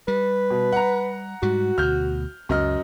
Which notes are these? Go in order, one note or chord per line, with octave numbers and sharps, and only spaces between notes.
G3 B4
B2
F#5 A#5
G#2 G3 F#4
D2 B2 F6 G6
C#2 F#2 D#5 F6